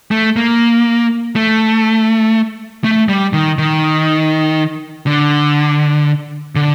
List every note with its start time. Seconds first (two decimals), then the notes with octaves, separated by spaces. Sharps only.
0.11 A3
0.36 A#3
1.36 A3
2.84 A3
3.09 G3
3.33 D#3
3.58 D#3
5.07 D3
6.56 D3